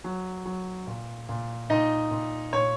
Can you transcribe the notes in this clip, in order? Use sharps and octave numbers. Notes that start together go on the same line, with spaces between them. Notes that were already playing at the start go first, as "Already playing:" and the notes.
F#3
F#3
A#2
A#2
A#2 D#4 D#5
A#2
A#2 C#5